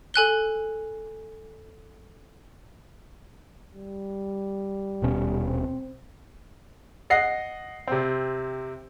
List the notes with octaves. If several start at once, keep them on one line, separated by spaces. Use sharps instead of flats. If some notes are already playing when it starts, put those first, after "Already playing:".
A4 G#5 F#6 G7
G3
D#1 B2 C#4
C4
D#5 F#5 A#6 C7
C3 C4